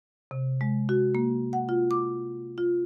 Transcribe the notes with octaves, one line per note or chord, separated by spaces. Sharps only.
C3
G#3
F#4
A#3
F#5
F4
D6
F4